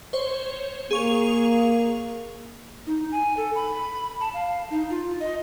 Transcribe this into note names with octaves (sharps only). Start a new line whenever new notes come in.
C5 C#5
A#3 G#4 C#6 F7
D#4
G#5
A4
B5
A5
F5
D#4
F4
D#5